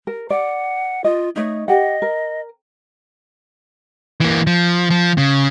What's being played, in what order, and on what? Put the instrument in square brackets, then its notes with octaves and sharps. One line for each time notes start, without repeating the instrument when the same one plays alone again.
[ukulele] A#4
[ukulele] D5 [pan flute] F#5
[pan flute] F4 [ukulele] D#5
[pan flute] A3 [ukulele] D#4 C#5 D#5
[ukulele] G4 F#5 [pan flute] D#5
[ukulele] A#4
[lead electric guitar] E3 A#3
F3
F3
C#3